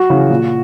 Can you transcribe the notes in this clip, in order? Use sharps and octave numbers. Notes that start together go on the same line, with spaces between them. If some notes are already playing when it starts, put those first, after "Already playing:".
Already playing: F#4
C#3 E3
A#2